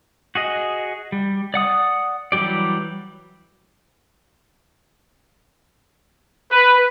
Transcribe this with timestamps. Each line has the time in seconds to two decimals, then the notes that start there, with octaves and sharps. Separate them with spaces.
0.35 F#4 G#4 D#5
1.12 G3
1.54 D5 F#5 D#6
2.32 E3 F#3 G3 G4 D5
6.52 B4